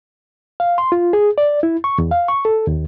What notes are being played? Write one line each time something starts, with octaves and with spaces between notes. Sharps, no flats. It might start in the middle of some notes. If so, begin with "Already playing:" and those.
F5
C6
F4
G#4
D5
E4
C#6
E2
F5
C#6
A4
D#2